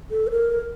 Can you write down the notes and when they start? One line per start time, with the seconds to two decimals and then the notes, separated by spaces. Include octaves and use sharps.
0.11 A4
0.27 C5
0.31 A#4